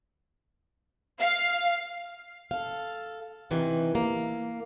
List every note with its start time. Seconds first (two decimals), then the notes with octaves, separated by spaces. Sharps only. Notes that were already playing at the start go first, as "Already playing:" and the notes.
1.20 F5
2.51 A4 F5
3.51 C3 D#3 E3
3.95 A#3